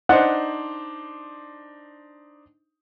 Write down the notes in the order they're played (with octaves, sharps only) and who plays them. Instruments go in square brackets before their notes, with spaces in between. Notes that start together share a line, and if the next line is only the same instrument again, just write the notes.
[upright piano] D4 D#4 C5 [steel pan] F#5